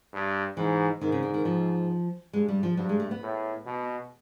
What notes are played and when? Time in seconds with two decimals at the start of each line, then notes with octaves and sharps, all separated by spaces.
0.13 G2
0.57 G#2 E3
1.01 G#2 D#3
1.12 C#3
1.23 D3
1.34 D#3
1.45 F3
2.33 G2 G#3
2.48 G3
2.63 F3
2.77 G2 F#3
2.89 G#3
3.00 A3
3.11 B3
3.22 A2
3.66 B2